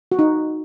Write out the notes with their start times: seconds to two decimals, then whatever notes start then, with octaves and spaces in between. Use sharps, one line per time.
0.12 F#4
0.19 D#4